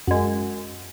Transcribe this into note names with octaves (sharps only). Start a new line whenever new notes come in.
F#2 G#3